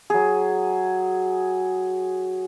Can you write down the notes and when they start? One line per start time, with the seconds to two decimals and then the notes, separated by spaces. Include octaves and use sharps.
0.10 F#3 G#4